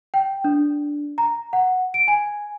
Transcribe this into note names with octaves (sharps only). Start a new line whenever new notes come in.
G5
D4
A#5
F#5
D7
G#5